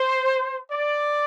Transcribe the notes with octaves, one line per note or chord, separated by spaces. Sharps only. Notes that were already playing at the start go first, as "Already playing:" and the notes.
Already playing: C5
D5